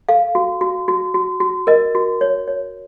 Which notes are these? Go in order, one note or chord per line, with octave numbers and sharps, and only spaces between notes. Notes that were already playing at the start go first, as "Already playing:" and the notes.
A4 F5
F#4
F#4
F#4
F#4
F#4
A#4 D#5
F#4
C#5
C#5